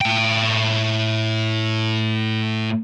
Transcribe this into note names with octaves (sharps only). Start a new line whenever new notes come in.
A2 G5